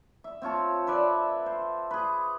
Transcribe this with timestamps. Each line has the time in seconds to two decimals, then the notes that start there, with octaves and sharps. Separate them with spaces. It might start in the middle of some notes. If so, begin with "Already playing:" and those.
0.24 E5
0.42 C4 F4 C#5 A5
0.87 A4 B4 D5 E5
1.46 C5
1.91 G#4 B4